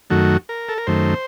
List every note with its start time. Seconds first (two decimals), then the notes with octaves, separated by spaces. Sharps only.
0.10 F#2 D#3 A3 F#4
0.49 A#4
0.69 A4
0.78 A#4
0.87 F#2 D#3 A3 C5